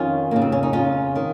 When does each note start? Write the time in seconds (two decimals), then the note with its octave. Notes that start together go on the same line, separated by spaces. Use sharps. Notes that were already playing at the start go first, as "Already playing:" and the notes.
Already playing: F2 D#3 C#4 F4
0.31 F2 C#3 A#3
0.42 C4
0.52 C#4
0.63 D#4
0.73 C#4 F4
1.16 D#3